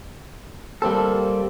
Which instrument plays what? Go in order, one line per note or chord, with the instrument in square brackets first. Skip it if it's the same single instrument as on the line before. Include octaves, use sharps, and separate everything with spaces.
[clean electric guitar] G3 A#3 C4 A4